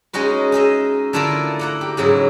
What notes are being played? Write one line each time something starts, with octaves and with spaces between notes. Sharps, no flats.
G#3 C#4 D#4 F#4 B4
D#4 G#4 D#5 E5
D3 A3 E4 F4 A4 A#4
A#3 F#5 A#5
G4
G#2 C#3 F#3 E4